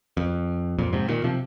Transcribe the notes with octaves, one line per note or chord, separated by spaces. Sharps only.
F2
F2 A#2
G#2 C3
A#2 D#3
C3 F3